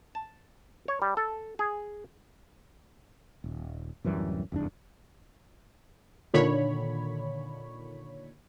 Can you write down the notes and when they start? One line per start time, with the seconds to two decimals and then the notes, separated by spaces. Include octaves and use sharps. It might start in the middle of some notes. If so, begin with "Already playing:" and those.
0.15 A5
0.88 C#5
1.02 G3
1.17 A4
1.59 G#4
3.44 D#1
4.04 D1 F#2 E3 G3
4.52 F1 E2 G2 D4
6.34 A#2 D3 D#3 C#5 B5